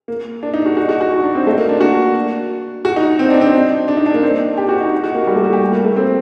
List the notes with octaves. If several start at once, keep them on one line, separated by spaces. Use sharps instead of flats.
A#3
D4
D#4
F#4
F#4
F#4
F#4
D#4
D4
C4
A3
A#3
D4
F#4
F#4
D#4
C4
D4
C4
D4
D#4
D4
A#3
C4
G4
F#4
D#4
F#4
A#3
G3
A3
F#4
G4
A#3
A3
C4